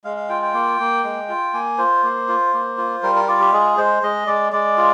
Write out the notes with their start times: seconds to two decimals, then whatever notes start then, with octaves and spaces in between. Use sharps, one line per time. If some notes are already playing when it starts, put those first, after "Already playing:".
0.04 G#3 F5
0.17 F5
0.29 F4 G5
0.42 G5
0.54 A#3
0.80 A#3
1.04 G#3
1.29 F4
1.54 A#3 G#5
1.78 F4 C5
2.03 A#3
2.29 F4
2.54 A#3
2.78 F4
3.03 G3 A#4
3.15 A#4
3.28 F4 D5
3.40 G4
3.52 G#3 G#4
3.78 G#3 C5
4.03 G#3 D#5
4.27 G#3 D5
4.52 G#3 D5
4.78 F4